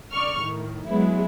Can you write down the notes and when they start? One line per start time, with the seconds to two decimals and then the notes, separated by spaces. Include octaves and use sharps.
0.12 D3 D5 C#6 F6
0.41 A2 D#3
0.86 F#3 G#3 B3 E4